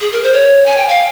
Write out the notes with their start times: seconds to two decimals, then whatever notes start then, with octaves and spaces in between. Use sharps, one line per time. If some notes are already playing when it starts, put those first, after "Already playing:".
0.01 G#4
0.12 A#4
0.23 C5
0.33 C#5
0.66 G#5
0.77 G5
0.88 F5